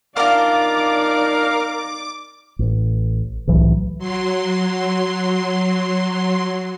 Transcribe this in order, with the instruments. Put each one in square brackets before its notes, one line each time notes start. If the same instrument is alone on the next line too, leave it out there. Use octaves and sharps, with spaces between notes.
[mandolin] D4 F4 [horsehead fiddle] D#4 D5 [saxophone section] A#4 F5 [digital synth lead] D6
[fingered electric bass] A1
C2 A2 E3 F#3
[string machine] F#3 C6